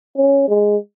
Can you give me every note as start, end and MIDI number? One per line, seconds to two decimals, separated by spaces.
0.17 0.44 61
0.48 0.77 56